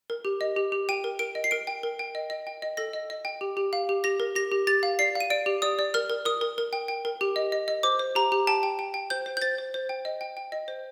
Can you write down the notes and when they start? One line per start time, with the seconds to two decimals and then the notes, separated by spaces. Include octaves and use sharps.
0.10 A#4
0.25 G4
0.41 D#5
0.57 G4
0.72 G4
0.89 G5 D#7
1.04 A#4
1.19 A#4 D7
1.35 D#5
1.44 C7
1.51 A#4 D7
1.67 G5
1.83 A#4
1.99 G5
2.15 D#5
2.30 D#5
2.47 G5
2.62 D#5
2.77 A4 A#6
2.93 D#5
3.10 D#5
3.25 G5
3.41 G4
3.57 G4
3.73 F5
3.89 G4
4.04 G4 A#6
4.20 A#4
4.35 G4 A#6
4.51 G4
4.67 G4 A6
4.83 F5
4.99 D5 C7
5.15 F5
5.20 D#7
5.30 D5 D7
5.46 G4
5.62 D5 D#6
5.79 D5
5.94 A#4 F6
6.10 A#4
6.25 A#4 D#6
6.41 A#4
6.58 A#4
6.73 G5
6.88 G5
7.05 A#4
7.21 G4
7.36 D#5
7.52 D#5
7.68 D#5
7.83 C5 D6
7.99 C5
8.15 G4 A#5
8.32 G4
8.47 G5 A5
8.63 G5
8.79 G5
8.94 G5
9.10 C5 G6
9.26 C5
9.37 G6
9.42 C5 A6
9.58 C5
9.74 C5
9.89 G5
10.05 D#5
10.21 G5
10.37 G5
10.52 D#5
10.68 C5